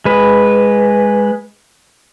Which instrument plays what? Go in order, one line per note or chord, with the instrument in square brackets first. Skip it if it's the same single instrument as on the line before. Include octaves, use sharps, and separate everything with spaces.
[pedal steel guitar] G#3 B4